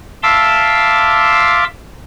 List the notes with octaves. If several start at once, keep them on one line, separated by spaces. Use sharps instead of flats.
E5 F5 A5 C6 D6 E6